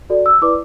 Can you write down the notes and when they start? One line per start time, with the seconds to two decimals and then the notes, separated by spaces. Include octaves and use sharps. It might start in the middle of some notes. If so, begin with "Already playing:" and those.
0.10 F#4 A4 D5
0.26 E6
0.42 E4 B4 D5 D6